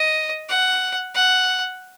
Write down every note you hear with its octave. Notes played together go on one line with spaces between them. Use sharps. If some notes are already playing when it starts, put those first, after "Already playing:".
Already playing: D#5
F#5
F#5